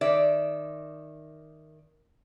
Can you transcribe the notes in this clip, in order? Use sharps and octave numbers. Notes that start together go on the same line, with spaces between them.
D#3 D5 E5